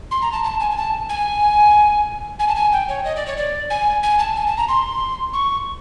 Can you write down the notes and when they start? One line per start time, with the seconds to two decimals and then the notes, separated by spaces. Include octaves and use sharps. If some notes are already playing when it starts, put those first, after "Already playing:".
0.11 C6
0.22 A#5
0.32 A5
0.44 A5
0.60 G#5
0.71 G#5
0.77 A5
1.09 G#5
2.39 G#5
2.48 A5
2.56 G#5
2.72 G5
2.88 C#5
3.05 D#5
3.16 D5
3.26 C#5
3.37 D5
3.70 G#5
4.03 G#5
4.19 A5
4.35 G#5
4.47 A5
4.57 A#5
4.68 C6
5.33 C#6